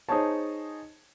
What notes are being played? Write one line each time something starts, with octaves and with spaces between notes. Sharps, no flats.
D#4 G#4 C5 C#5 A5